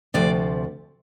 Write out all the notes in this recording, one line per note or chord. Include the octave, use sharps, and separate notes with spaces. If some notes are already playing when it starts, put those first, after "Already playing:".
D2 C3 F3 D5